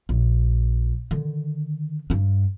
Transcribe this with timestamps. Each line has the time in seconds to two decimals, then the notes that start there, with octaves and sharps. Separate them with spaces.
0.09 A#1
1.11 D3 D#3
2.10 G2 D4